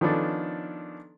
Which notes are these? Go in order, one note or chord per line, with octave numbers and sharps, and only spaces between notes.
D#3 F3 B3 C#4 D4 A4